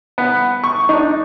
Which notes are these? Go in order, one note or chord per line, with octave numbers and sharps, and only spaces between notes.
B3
C#6
D4 D#4